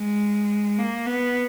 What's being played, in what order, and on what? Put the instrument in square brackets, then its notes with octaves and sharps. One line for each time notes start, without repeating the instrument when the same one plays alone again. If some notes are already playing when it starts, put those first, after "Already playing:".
Already playing: [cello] G#3
A#3
B3